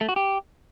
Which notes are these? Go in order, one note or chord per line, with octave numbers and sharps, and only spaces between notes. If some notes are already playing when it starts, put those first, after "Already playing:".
A3
F#4
G4